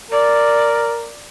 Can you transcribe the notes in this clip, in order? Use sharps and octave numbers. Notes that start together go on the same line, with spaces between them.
A#4 D5